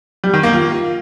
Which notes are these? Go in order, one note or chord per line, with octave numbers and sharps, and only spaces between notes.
G3
D#3
A#3
F4